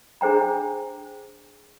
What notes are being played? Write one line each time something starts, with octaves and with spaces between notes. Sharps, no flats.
D4 G#4 C5 G5 A#5